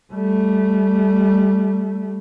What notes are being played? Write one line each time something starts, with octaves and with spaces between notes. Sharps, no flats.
G3 A3